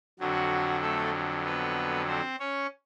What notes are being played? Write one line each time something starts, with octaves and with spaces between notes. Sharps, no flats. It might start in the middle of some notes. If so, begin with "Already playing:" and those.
F2 D3 F#3 F#4
A3 A4
B3 B4
C4 C5
C#4 C#5